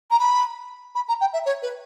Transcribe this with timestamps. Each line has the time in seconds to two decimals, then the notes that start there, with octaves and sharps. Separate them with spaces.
0.10 A#5
0.19 B5
0.95 B5
1.08 A#5
1.21 G5
1.33 E5
1.46 C#5
1.62 B4